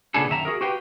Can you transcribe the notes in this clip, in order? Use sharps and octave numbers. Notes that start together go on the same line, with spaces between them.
A#2 C#3 B3 D4 G#4 A4
F#2 D#3 E5 A#5
F#4 G#4 A#4
F#4 G4 B4 F5 G5